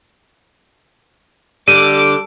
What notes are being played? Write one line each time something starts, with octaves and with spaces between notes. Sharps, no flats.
D3 G3 D6 D#7